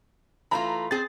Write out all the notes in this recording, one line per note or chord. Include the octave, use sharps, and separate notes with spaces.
E3 A3 F4 A#5 B5
C4 G#4 A6